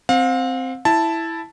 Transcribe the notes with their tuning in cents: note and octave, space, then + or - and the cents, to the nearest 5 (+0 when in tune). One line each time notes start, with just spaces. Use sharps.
C4 +0 F5 +40
E4 +0 A5 +0